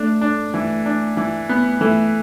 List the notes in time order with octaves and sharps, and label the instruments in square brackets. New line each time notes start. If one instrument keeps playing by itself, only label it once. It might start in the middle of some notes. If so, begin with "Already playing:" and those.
Already playing: [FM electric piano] A3 [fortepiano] D4
[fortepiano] D4
E3
D4
E3
B3
[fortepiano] E3 [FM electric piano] A3